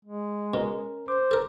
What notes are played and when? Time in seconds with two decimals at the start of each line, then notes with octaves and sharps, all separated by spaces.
0.05 G#3
0.54 B2 C#4 A#4
1.08 C5 D6
1.31 A4 A#4